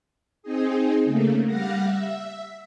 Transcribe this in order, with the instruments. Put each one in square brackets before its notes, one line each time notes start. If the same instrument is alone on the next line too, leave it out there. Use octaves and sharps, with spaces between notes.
[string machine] C4 D#4 G#4
C#3 A3 A#3
G3 F5 F#5 A#6
E5